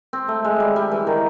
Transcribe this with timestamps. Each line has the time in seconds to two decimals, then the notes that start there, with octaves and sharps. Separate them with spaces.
0.13 C4
0.28 A3
0.44 G#3
0.60 G3
0.76 G3
0.92 E3
1.07 D#3